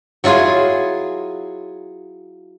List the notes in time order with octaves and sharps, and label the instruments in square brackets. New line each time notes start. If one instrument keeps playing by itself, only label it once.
[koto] F#3 E4 F4 G#4 G#5